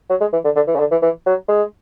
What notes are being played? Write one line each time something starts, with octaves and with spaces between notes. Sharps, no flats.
F#3
G#3
E3
D3
D3
E3
C#3
D3
E3
E3
F#3
G#3